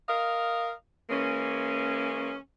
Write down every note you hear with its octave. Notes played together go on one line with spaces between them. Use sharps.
A#4 D#5 F5
E3 G#3 A#3 C#4